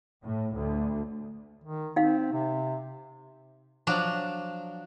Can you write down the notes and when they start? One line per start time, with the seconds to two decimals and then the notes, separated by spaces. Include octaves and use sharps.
0.24 A2
0.56 D2
1.64 D#3
1.96 C4 D#4 F5
2.33 C3
3.87 F3 F#3 D4